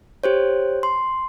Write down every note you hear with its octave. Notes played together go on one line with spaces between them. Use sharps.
G4 C5 C#5
C6